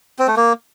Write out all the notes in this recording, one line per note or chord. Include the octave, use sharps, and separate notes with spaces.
C4
A3
A#3